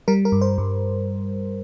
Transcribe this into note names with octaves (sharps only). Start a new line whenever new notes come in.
G3 A#4
A#4
G2
C5
G2